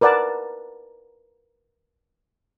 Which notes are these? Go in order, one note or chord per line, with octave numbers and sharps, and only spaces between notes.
A#4 B4 D5 F#5 A5